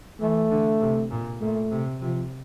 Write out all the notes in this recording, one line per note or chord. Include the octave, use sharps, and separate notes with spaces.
E3 A3
D3
C3
A#2
A#2 A3
C3
C3 F3